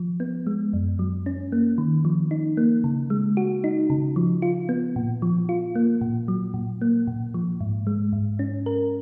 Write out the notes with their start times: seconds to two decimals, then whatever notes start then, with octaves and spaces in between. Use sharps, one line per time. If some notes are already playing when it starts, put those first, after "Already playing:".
Already playing: F3
0.20 B3
0.47 G#3
0.73 F#2
0.99 F#3
1.26 C#4
1.52 A#3
1.78 D#3
2.05 F3
2.31 D#4
2.57 A#3
2.84 C#3
3.10 G#3
3.37 F#4
3.64 D#4
3.90 C#3
4.16 F3
4.42 F4
4.69 B3
4.96 A#2
5.22 F3
5.49 F4
5.75 A#3
6.01 A#2
6.28 F#3
6.54 A#2
6.81 A#3
7.07 A#2
7.34 F3
7.61 G#2
7.87 G#3
8.13 G#2
8.39 C#4
8.66 A#4